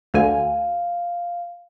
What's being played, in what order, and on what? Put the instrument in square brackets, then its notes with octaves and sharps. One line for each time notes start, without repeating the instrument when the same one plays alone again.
[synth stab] D2 D3 G#5 [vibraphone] F5